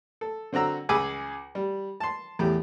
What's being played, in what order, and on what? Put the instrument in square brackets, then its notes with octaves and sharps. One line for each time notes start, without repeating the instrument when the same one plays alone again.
[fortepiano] A4
D3 C4 F#4 A#5 E6
C#2 G#4 G#5 B5 D6 E6
G3
A5 C6
E2 A2 G4